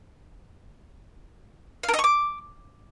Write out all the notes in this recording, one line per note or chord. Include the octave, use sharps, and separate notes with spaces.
F5
A#4
D#5
C#6
D6